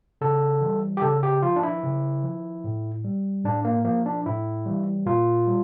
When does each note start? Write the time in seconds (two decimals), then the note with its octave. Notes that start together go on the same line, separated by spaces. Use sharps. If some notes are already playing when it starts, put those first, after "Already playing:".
0.21 C#3 A4
0.61 E3 G3
0.97 G4
1.02 C#3 A4
1.23 G4
1.43 F3 F4
1.56 D4
1.63 E4
1.83 C#3
2.24 F3
2.64 A2
3.04 G3
3.44 A2 D4
3.65 A#3
3.84 F3 A#3
4.06 D4
4.26 A2 E4
4.66 E3 G3
5.06 A#2 F4
5.47 G3